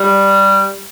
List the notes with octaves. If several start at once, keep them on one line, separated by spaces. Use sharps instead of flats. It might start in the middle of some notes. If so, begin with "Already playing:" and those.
Already playing: G3